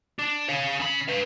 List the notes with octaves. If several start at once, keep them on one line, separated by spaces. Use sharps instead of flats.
D4
C#5 F5
C#3 B5
B4 F5